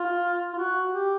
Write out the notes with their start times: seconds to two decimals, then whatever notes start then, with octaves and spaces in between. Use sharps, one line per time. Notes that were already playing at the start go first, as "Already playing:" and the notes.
Already playing: F4
0.54 F4
0.58 F#4
0.92 G4